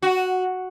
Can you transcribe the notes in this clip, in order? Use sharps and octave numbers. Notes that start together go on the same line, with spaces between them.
F#4